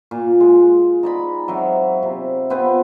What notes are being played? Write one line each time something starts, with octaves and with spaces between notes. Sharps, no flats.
A#2
G#3
D#4 D5 B5
F#3 C4 E5 F5
C3
B3 C4 F4 B4